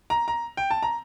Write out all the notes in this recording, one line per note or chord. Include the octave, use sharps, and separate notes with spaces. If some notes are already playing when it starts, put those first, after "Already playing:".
A#5
A#5
G5
A5
A#5